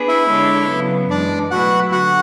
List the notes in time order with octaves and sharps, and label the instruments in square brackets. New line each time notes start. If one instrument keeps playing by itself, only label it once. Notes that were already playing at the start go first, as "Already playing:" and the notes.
Already playing: [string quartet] B3 D4 G#4 B4
[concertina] E4 E5
[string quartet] D3 G#3 D4 A4 C#5
C#3 F#3 B3
[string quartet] F#2 E3 G#3 [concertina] D4 D5
[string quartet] B2 F#3 A3 E4 B4 [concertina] F#4 F#5
[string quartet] D3 [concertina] F#4 F#5